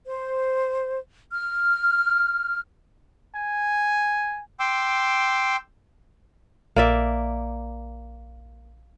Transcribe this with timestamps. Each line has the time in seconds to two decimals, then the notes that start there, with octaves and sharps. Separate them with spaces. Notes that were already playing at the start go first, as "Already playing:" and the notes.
0.05 C5
1.32 F6
3.35 G#5
4.60 G5 C6 D6 E6
6.76 A#1 A#3 D5 E5